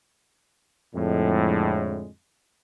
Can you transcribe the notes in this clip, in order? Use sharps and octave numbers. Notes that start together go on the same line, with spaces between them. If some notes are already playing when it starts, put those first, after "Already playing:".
F2 A2 D3 G#3